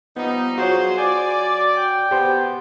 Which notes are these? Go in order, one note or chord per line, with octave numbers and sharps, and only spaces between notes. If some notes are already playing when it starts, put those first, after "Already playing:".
F3 G3 B3 D#4
F4 F#4 G#4 C5 C#5
D5 G#5
G5
B3 G4 C5